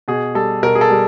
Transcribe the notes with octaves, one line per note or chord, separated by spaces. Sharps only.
B2 G#4
G3 A4
B2 A#4
G#4
A4
G3